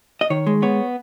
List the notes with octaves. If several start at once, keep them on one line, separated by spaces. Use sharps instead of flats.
D#5
D#3 C#5
G#3
B3 C#5